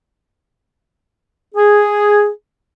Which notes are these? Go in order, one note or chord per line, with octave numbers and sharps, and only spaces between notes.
G#4